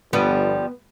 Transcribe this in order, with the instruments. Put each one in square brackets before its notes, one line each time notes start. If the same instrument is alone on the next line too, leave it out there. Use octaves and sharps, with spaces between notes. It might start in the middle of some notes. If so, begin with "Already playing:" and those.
[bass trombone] G1 [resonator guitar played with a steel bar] F3 G3 [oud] B3